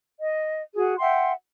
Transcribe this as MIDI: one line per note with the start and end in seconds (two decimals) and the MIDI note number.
0.19 0.61 75
0.75 0.94 66
0.75 0.94 68
0.99 1.32 76
0.99 1.32 78
0.99 1.32 79
0.99 1.32 84